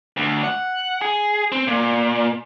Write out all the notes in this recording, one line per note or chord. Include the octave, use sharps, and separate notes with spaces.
D2
F#5
G#4
C4
A#2